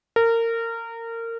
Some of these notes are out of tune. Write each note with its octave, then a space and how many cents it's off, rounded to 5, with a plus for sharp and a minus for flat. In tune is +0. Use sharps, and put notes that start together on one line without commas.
A#4 -25